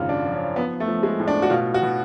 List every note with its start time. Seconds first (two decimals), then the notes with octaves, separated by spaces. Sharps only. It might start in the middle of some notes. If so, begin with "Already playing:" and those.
Already playing: G#1 F#2 C#3 F4
0.09 D4
0.26 F3
0.33 C#4
0.56 F3 B3
0.80 A3
0.88 F3
1.03 G#3
1.20 A2
1.28 D4
1.42 F#4
1.50 B2 F4
1.74 F#4
1.82 B2